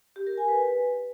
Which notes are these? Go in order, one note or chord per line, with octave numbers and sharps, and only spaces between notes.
G4
A#4
G#5
B4